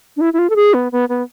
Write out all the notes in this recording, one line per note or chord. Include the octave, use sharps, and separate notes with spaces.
D4
E4
E4
F4
A4
G#4
B3
B3
B3